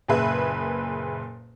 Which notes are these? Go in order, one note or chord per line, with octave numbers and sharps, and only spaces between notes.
F#1 A#2 G#4 B4 E5